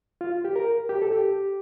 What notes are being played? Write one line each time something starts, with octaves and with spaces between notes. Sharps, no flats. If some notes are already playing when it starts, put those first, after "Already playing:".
F4
G4
A#4
G4
A4
G4